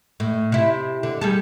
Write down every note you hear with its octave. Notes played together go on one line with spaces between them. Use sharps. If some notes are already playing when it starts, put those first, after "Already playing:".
A2
C3 E4
D3
G3 G#4 A4